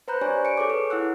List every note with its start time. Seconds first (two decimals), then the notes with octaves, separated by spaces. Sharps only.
0.08 B4 C5 A#5 B5 F#6 G6
0.21 D4 G4 C#5 D5 G#5
0.45 C#7 D7
0.57 G#4 A4 C#5 D6
0.70 B4
0.90 E4 F#5 E6 F#6